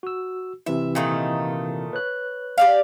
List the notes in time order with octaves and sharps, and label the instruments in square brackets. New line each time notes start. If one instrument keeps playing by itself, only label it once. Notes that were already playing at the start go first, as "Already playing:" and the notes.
[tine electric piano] F#4 E6
[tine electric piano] C3 E3 E4 [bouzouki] E5
[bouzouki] A#2 D#3 A3
[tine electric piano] B4 C#5 F#6
[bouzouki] G4 D5 F5